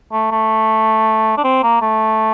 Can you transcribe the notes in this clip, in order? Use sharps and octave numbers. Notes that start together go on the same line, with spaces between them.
A3
A3
D4
C4
A#3
A3